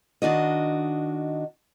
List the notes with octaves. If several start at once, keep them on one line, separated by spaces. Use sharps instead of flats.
D#3 D4 F#4 D#5